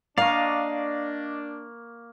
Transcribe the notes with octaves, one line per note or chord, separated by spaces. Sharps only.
A#3 D4 D5 D#5 F5 C#6